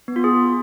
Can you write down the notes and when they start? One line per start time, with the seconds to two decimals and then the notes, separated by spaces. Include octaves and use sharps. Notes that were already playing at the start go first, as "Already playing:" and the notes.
0.08 B3
0.16 F4
0.24 G#4